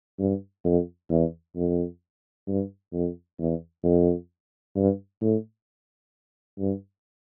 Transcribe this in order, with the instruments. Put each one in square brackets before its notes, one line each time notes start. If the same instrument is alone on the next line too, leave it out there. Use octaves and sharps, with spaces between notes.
[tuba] G2
F2
E2
F2
G2
F2
E2
F2
G2
A2
G2